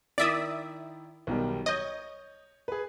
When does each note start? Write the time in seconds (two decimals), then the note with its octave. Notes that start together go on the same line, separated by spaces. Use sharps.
0.18 D#3 E4 D5 E5 D#6
1.27 B1 D#3 G3
1.66 C#5 D#5 G6
2.68 G#4 B4